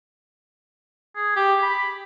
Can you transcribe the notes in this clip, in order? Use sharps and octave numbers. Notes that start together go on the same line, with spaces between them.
G#4
G4
B5